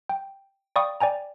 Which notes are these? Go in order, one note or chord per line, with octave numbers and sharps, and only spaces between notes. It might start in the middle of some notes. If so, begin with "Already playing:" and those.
G5
D5 F5 G5 B5 C#6 D#6
D5 G5 G#5 A#5